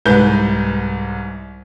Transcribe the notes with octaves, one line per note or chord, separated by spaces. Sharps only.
C2 G#2 B4 G6